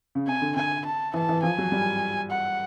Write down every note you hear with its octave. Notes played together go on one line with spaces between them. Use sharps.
C#3
C3 G#5
D3
D3 G#5
A5
E3 A5
E3
F3 G#5
F#3
G3
F#5